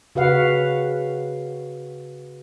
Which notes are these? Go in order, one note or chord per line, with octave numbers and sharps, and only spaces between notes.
C#3 F#4 B4 F5 F#5